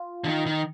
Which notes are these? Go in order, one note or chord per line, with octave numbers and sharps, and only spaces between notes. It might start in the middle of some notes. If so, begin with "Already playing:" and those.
Already playing: F4
D3
D#3
D#3